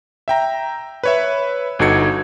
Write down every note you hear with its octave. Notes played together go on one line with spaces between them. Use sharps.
E5 G5 A#5
B4 C#5 E5
G1 D#4 F#4 A4 G#6 C#7